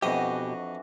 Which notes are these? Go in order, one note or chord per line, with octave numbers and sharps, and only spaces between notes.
F2 B2 E3 D4 F#4 G4 D#5 D#6